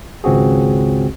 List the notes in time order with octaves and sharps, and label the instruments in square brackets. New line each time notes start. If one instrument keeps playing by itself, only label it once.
[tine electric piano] G#1 C#2 C4 F#4 G#4